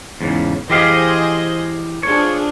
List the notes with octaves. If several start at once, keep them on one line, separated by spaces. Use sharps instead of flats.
E2 G#2 C#3
E3 G4 G#4 C5 D#5 F5
F3 D4 G#4 C#5